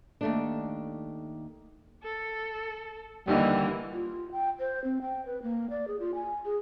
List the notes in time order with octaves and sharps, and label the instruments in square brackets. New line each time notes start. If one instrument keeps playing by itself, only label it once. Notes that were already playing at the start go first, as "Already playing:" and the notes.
[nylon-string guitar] D#2 A3 D4
[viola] A4
[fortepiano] D#2 D3 D#5 [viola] E3 A#3 [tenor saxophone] G3
[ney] F4
G5
C5
C4
G5
B4
A#3
D5
G#4
F4
G#5
G#4